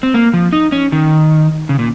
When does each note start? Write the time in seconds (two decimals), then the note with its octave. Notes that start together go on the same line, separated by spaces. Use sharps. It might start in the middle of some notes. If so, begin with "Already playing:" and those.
0.03 C4
0.14 A#3
0.33 F3
0.53 D#4
0.72 C#4
0.92 D#3
1.69 C#3
1.79 A#2